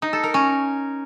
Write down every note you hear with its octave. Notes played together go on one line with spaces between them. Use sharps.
D#4
A4
A#4
C#4